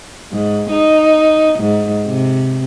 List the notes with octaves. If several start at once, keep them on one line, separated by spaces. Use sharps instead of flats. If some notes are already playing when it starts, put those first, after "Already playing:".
G#2
D#4
G#2
C3